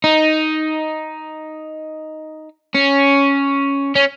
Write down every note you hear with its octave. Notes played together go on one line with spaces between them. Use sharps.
D#4
C#4
C#4